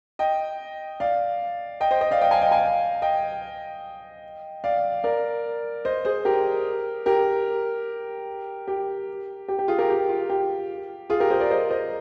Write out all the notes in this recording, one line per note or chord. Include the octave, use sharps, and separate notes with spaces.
D#5 G5
D5 F5
D#5 G5
C5 D#5
C5 D#5
D5 F5
D#5 G5
F5 G#5
D#5 G5
F5 G#5
D#5 G5
D5 F5
A#4 D5
C5 D#5
G#4 C5
G4 A#4
G4 A#4
G4
G4
G4
F4 G#4
G4 A#4
G4
F4
G4
F4 G#4
G4 A#4
G#4 C5
A#4 D5
C5 D#5
C5 D#5